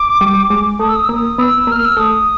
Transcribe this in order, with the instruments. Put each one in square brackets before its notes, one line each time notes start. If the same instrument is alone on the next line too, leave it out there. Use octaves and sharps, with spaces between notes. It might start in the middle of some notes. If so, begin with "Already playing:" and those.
Already playing: [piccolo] D6
[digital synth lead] G3
G#3
[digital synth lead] A3 [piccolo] D#6
[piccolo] E6
D#6
E6
[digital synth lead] A#3 [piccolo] D#6
[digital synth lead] B3 [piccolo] E6
[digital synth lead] A#3
[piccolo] F6
E6
[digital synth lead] A3 [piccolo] D#6